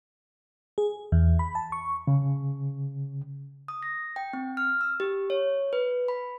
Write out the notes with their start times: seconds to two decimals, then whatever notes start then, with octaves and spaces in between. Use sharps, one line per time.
0.78 G#4
1.12 E2
1.39 B5
1.55 A5
1.72 C#6
2.07 C#3
3.68 D#6
3.83 A#6
4.16 G5
4.33 C4
4.57 F6
4.81 E6
5.00 G4
5.30 C#5
5.73 B4
6.08 B5